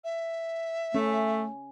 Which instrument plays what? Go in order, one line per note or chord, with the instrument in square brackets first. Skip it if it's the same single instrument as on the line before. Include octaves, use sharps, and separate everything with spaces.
[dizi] E5
[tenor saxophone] A3 [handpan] C#4